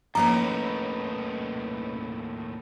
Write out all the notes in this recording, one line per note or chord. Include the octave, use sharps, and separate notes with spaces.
D#2 A2 F3 A#3 C#4 D#4 B4 A#5